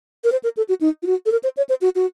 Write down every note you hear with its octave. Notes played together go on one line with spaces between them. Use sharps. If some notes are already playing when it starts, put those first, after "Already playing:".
A#4
C5
A#4
A4
F#4
D#4
F4
F#4
A4
A#4
C5
C#5
C5
F#4
F#4